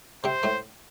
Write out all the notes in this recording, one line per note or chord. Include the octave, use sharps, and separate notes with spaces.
C3 C4 C5
A2 A3